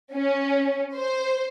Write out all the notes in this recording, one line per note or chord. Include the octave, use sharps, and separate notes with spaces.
C#4
C5